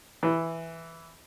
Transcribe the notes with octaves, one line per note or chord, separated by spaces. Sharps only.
E3